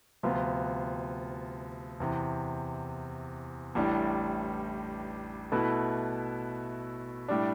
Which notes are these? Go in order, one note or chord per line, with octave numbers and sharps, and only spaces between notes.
D2 C3 F3 B3 F4
E2 C3 E3
A1 A2 G3 D4
B2 A3 E4 B4
A2 G3 D4